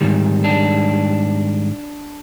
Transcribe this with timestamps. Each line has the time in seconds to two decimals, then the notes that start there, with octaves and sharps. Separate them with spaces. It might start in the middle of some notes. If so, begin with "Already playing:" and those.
0.01 G#2 D#3 G3
0.44 D4